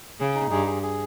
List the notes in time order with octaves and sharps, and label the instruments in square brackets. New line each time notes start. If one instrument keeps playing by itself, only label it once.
[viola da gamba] C#3 [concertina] G#4
[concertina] D#4
[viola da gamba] G2 [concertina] G#4
[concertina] G#4
G#4